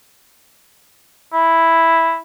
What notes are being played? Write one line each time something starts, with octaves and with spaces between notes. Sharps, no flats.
E4